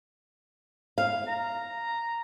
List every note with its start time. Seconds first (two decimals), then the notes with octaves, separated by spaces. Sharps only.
0.98 F5
1.27 A#5